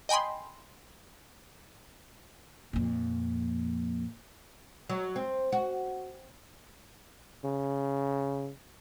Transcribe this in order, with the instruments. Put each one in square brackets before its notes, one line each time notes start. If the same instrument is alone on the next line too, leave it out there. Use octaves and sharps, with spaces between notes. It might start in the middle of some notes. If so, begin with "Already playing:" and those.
[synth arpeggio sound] D#5 G5 G#5 B5 C6
[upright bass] F2 A#2
[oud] F#3
C4
F#4
[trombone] C#3